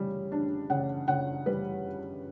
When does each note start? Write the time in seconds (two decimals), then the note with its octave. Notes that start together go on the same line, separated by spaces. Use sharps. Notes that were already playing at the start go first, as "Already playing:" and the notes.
Already playing: C#3 G3
0.32 D4
0.70 C#3 F#5
1.08 C#3 F#5
1.46 G3 B4